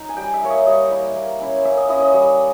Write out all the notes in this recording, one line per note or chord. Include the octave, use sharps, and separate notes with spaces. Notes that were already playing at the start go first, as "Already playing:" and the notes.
Already playing: D#4 A#5
G#5
G3 G5
E5
A#3 E4 C#5
D#5
G3 D#5
A#3 E4
A#3
C#4 E4
A#3 E5
D#5
C#4 E4 D#5
D#5
G3